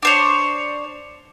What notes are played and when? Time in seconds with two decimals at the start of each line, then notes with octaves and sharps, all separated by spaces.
0.03 D4 C5 C#5